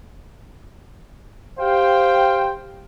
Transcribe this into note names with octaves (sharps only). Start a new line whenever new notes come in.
G4 C5 F5 G5